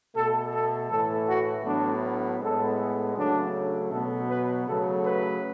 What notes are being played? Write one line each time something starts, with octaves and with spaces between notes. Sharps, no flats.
B2 A3 A4
A4
A2 E3 A3 A4
F#4
A2 F#3 B3 D4
A2 G#3 B3 A4
C#3 F#3 A3 D4
B2 F#3 B3 A4
B4
C#3 F#3 A3 A4
B4